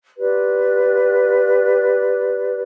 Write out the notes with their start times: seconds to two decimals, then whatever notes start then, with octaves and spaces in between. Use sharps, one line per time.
0.18 F4 G4 B4 D5